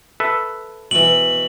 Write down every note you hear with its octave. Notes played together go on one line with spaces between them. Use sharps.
A4 B4 E5
B2 E3 F#7